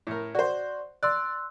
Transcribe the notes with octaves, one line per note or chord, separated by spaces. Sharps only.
A2 A#4
F#4 C5 D5
D5 C6 E6 F#6